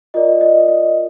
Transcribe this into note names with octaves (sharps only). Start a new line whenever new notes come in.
F4 A#4 D5 D#5
D#5
D#5